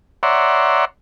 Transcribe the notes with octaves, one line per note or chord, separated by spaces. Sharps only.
C#5 D5 E5 F#5 A#5 C6